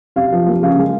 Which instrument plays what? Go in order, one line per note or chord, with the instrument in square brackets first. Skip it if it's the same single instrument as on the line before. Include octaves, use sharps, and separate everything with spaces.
[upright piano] C3 F5
F3
A#3
C#3 F5
G#3